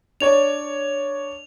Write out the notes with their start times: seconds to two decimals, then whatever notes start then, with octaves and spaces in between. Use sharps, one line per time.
0.20 D4 C#5 D5 F7